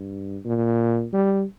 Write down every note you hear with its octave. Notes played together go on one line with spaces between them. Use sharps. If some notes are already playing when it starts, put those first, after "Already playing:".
Already playing: G2
A#2
G3